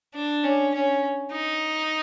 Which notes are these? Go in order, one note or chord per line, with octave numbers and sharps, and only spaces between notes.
D4
C#4
C#4
D#4